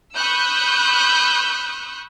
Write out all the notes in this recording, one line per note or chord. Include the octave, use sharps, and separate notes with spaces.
B5 C#6 D#6 E6 F#6 G6